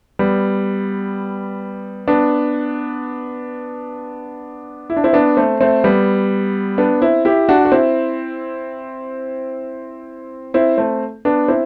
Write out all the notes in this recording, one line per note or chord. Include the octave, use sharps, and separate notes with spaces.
G3 B3
B3 D4
E4
D4
C4 E4
B3 D4
A3 C4
A3 C4
G3 B3
B3 D4
C4 E4
E4 G4
D4 F#4
F#4
C4 E4
C4 E4
A3 C4
B3 D4
C4 E4